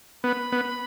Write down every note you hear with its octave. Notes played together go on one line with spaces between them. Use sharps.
B3 B5
B3